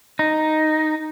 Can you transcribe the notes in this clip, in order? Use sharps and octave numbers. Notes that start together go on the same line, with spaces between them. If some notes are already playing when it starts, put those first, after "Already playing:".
D#4